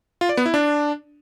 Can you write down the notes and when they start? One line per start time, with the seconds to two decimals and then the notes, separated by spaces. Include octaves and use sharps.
0.21 F4
0.29 D5
0.37 B3
0.46 E4
0.54 D4